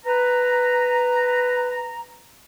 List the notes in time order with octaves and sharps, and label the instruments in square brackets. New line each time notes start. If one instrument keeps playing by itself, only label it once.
[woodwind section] B4 A#5